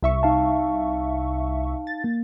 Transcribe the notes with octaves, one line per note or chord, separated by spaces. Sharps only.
C2 E5 C#6
D#4 F5 A5
A6
A#3